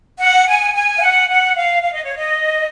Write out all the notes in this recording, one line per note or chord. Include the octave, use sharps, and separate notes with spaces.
F#5
G#5
G#5
F5
F#5
F#5
F5
F5
D#5
C#5
D#5